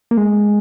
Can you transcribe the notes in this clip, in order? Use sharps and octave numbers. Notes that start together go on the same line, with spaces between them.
A#3
G#3